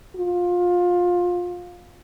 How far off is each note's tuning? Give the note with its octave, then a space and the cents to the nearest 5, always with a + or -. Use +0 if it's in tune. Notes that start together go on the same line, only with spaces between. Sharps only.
F4 +20